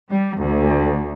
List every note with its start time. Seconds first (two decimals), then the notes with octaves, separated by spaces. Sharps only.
0.10 G3
0.40 D2